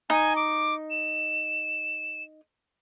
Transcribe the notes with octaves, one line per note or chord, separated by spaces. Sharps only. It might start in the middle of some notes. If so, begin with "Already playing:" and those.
D#4 G#5
D6
E7